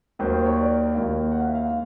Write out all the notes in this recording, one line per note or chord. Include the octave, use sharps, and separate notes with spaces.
D#2 D#3 F#3 A#3 C5
C5
C#5
D5
D#2 D#3 F#3 A#3 F5
F#5
F5
E5
F5
D#3 A#3